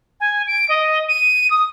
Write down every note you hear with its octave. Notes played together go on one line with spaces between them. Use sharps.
G#5
D7
D#5
D#7
D#6